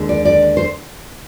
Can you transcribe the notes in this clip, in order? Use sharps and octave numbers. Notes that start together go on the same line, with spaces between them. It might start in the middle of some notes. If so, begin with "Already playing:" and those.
Already playing: D#2 D3 G#3
D5
D5
C5